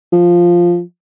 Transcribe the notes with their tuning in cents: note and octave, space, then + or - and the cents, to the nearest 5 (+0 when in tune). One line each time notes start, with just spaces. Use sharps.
F3 +0